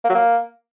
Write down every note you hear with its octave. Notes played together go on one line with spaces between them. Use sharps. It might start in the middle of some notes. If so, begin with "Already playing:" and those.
A#3
F#3
A#3